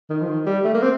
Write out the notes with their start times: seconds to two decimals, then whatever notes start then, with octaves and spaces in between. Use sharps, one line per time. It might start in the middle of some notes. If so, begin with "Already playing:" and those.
0.09 D#3
0.21 F3
0.27 D#3
0.46 G3
0.64 A3
0.74 A#3
0.82 C4